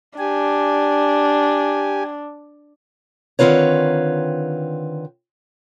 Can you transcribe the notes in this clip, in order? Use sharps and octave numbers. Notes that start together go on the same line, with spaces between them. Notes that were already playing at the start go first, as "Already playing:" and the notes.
D4 G4 G#5
D3 D#3 C4 F4 B4 C#5